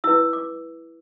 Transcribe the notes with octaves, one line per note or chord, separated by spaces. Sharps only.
E4 B4 E6
D6